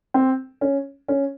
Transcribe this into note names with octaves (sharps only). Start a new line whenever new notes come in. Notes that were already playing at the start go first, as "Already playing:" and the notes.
C4
C#4
C#4